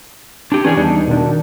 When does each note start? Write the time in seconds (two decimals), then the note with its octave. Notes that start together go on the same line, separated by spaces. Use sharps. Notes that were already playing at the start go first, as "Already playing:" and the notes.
0.52 D4 G4
0.65 E3 C#4 D4 G4 G#4 G#5
0.77 E2 G3 D4 D#4
1.07 B2 D#3 D4